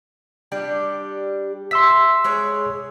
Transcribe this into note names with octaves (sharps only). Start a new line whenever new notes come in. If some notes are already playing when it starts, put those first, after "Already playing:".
G3 D4 G4
E5 C6 E6 B6
G#3 G#4 C#5